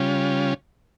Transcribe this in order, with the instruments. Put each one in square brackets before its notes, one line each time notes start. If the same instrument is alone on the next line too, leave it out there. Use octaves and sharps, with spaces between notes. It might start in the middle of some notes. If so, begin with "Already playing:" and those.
Already playing: [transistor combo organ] C#3 G3 C#4 F4